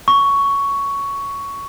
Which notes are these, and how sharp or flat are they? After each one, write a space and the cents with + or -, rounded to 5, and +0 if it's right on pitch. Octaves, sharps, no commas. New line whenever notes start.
C#6 +10